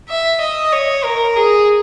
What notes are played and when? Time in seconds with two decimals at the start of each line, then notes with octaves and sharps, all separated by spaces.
0.09 E5
0.41 D#5
0.73 C#5
1.04 A#4
1.36 G#4